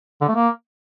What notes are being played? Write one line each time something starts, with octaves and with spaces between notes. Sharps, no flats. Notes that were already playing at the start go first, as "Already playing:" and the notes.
D3
A3
A#3